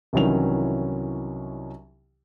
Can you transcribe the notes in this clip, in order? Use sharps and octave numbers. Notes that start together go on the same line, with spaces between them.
C2 D#3 E3 F#3 C#4 F7